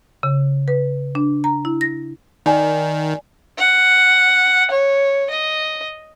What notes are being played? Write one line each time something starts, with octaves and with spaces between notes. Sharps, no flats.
C#3
B4
D4
A#5
E4
A#6
D#3 D5 G#5
F#5
C#5
D#5